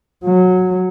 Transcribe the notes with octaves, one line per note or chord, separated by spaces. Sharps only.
F#3